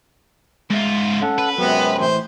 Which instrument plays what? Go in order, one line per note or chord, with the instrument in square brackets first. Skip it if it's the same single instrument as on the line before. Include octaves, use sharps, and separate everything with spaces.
[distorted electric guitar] G#2 F4 [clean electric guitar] G#3 E5
[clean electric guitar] C#4 [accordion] A4 F#5
[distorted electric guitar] B4
[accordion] F#2 C3 C4 [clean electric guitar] F#3 G#3 [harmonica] B3
[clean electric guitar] A2 E3 [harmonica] C5